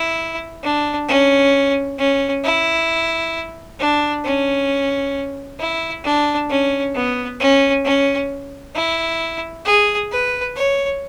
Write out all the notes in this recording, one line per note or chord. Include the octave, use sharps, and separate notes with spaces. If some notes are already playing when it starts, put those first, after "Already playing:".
Already playing: E4
D4
C#4
C#4
E4
D4
C#4
E4
D4
C#4
B3
C#4
C#4
E4
G#4
B4
C#5